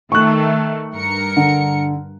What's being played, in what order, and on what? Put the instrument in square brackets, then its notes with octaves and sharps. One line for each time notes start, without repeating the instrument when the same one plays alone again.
[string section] D#3 A3 [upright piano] C#6 F#6
[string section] G2 A#4 C#7
[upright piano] D3